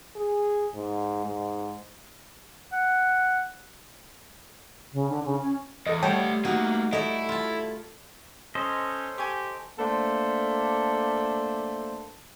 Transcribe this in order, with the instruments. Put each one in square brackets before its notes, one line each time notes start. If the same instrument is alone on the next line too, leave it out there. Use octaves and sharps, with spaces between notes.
[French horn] G#4
G#2
G#2
[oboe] F#5
[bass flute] C#3
D3
C#3
C#4
[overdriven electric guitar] E2 [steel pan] A4 D#5
[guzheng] G3 [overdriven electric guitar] A3 F#5 [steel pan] C#5 G5 A5
[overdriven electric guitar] A3 A#3 [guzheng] D#4 F#4
[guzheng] A3 D5 [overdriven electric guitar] E4 [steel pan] D#5
[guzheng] F4 A5
[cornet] C#4 [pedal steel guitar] A4 C5 D#5
[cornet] G4 [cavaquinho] G#5 C#6
[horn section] A3 A#3 D4 A4 C5